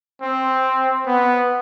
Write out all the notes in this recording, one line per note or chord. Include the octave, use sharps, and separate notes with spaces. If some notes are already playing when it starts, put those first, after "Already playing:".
C4
B3